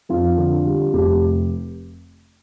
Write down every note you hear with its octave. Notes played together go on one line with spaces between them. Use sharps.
F2 F4
D3
G3
F1 G4